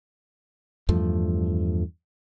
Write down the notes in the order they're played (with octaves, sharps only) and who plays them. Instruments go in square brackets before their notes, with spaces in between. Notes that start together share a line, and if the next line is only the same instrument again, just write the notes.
[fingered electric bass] E2 G2 F3 A3